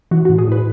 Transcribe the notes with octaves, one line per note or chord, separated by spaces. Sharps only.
E3 F#4
A2 F#4
G#4
A2 B4